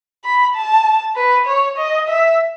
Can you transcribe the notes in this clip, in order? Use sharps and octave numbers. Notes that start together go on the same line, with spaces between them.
B5
A5
B4
C#5
D#5
E5